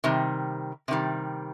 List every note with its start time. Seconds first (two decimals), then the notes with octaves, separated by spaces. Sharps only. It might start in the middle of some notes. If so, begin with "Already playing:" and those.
0.04 C3 D#3 G3
0.88 C3 D#3 G3